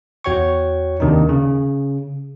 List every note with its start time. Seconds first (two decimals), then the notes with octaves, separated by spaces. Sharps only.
0.24 E2 F#4 C#5 G5 C#6
1.00 D#2 C3 D#3 D4 D#4
1.29 C#3